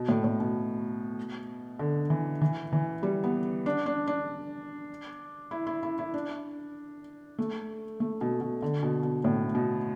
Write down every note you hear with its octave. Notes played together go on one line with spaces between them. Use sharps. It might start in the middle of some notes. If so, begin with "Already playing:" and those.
Already playing: B2
A2
A2
B2
D3
E3
E3
E3
G3
B3
D4
D4
D4
E4
E4
E4
E4
D4
A3
A3
B2
B2
D3
B2
B2
A2
B2